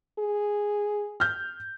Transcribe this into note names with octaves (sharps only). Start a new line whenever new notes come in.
G#4
F6 G6